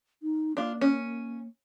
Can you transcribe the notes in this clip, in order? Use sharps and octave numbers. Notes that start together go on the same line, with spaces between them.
D#4
A#3 D4 F4
C#4